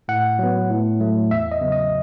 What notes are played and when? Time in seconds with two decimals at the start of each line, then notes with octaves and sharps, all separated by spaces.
0.08 A2 F#5
0.39 F#3 B3
0.70 A2
1.00 F#3 A3
1.31 E2 E5
1.52 D#5
1.61 C#3 F#3 B3
1.72 D#5